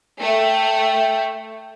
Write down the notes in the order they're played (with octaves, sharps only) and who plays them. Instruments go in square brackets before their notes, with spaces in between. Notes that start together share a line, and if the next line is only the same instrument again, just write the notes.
[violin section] A3 [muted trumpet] G5